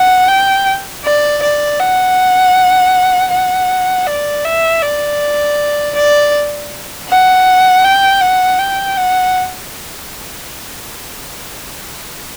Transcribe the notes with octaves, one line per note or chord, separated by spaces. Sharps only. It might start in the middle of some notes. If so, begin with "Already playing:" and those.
Already playing: F#5
G5
D5
D5
F#5
F#5
D5
E5
D5
D5
F#5
G5
F#5
G5
F#5